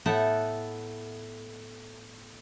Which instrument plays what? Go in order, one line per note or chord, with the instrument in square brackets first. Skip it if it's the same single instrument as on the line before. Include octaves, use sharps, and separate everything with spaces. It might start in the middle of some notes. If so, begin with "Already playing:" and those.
[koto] A2 B3 A4 E5 F#5 G5